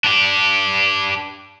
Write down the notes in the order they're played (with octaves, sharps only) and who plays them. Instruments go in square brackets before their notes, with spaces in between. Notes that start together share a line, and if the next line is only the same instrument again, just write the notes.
[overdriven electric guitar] D4 G4